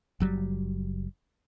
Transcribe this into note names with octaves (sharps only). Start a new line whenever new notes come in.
F#1 F#3 G3